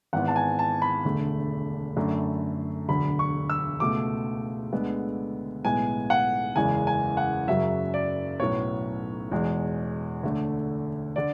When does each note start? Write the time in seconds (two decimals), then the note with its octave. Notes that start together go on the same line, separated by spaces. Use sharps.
0.13 G#1 G#2 E3 B3 F#5
0.28 A5
0.36 G#5
0.59 A5
0.82 B5
1.05 E1 D2 D3 A3
1.96 F#2 D3 A3
2.88 E1 D2 D3 F#3 B5
3.19 C#6
3.50 E6
3.80 C#2 B2 A3 D6
4.72 D2 D3 G#3 B3
5.64 B1 A2 G#3 B3 G#5
6.10 F#5
6.56 F#1 E2 C#3 E3 G#3 G#5
6.87 G#5
7.17 F#5
7.48 F#1 F#2 C#3 F#3 E5
7.94 D5
8.40 B1 A2 F#3 B3 C#5
9.31 E2 B2 G#3
10.23 D2 D3 A3
11.16 D3 D5